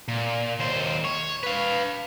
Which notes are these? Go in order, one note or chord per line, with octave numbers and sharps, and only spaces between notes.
A#2
D#2 C5
C#5
B4 F5